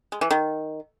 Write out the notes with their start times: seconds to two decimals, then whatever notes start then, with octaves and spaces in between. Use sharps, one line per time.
0.12 G#3
0.21 E3
0.31 D#3